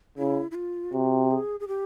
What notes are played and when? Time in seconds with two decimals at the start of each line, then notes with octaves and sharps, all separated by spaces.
0.18 C#3 E4
0.51 E4
0.55 F4
0.93 C3 F#4
1.31 G#4
1.60 G#4
1.68 G4